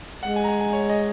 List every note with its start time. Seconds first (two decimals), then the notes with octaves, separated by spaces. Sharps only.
0.23 G#3 F#5
0.36 G#5
0.44 A#5
0.48 G#5
0.60 G#5
0.73 C#5
0.90 D#5